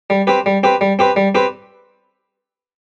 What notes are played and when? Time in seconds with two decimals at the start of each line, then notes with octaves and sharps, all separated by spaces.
0.10 G3
0.27 C4 G4 B4
0.46 G3
0.63 C4 G4 B4
0.81 G3
0.99 C4 G4 B4
1.16 G3
1.35 C4 G4 B4